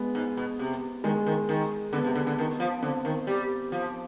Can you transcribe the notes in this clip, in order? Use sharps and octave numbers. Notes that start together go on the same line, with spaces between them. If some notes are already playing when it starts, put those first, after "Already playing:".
Already playing: G#3 B3
G#2
B2
C3
D#3 G#3
D#3
D#3
D3 B3
C3
D3
D3
D#3
F3
D3 C4
D#3
G3
F3